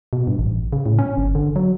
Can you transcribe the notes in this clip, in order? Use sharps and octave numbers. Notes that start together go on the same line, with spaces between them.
B2
G2
A1
C#3
A2
C#4
G1
D3
F#3